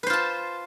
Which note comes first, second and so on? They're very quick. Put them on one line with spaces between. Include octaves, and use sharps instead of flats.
B4 C5 F4 A5